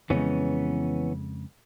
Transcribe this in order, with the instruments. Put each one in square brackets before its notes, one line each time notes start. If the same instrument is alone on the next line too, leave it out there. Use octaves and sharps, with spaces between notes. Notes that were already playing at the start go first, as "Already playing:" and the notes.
[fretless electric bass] F2 C#3 G#3 [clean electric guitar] E3 B3 C#4